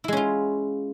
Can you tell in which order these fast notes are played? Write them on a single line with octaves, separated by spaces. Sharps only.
E4 G#3 C#4 F4